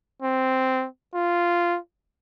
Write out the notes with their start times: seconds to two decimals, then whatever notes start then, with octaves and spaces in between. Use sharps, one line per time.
0.22 C4
1.14 F4